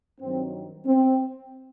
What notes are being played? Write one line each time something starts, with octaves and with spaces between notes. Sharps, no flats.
G2 D#3 F#3 C4
C4